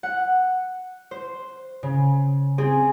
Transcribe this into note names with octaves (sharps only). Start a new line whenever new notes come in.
F#5
C5
C#3
C4 G#4